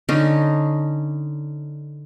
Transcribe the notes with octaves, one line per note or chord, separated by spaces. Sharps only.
D3 C#4 D#4